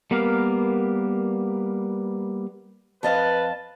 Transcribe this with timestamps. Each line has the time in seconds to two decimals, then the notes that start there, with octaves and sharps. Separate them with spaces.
0.11 G3 A#3 B3 A#4 F5
3.03 F2 B4 D#5 F5 A5